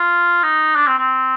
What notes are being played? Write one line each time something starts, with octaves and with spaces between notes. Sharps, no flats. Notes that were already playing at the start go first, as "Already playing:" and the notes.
Already playing: F4
D#4
D4
C4
C4